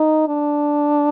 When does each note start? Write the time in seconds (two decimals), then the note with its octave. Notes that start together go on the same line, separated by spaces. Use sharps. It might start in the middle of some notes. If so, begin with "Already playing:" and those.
Already playing: D#4
0.28 D4